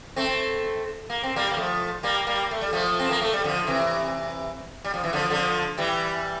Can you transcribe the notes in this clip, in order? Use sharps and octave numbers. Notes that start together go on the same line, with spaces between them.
A3 C4
A#3
C4
G3 A#3
A#3
F3 A3
G3 A#3
G3 A#3
A3
G3
F3 A3
C4
A#3
A3
G3
D3 F3
C3 E3
G3
F3
E3
D3 F3
D3 F3
E3 G3